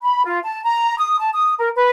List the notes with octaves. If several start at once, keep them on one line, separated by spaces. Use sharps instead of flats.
B5
F4
A5
A#5
D#6
A5
D#6
A#4
B4